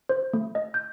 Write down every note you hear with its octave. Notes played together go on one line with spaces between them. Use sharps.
C5
A3
D#5
G6